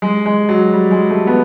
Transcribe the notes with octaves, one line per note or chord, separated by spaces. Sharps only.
G#3
G#3
F#3
G3
G#3
A3
B3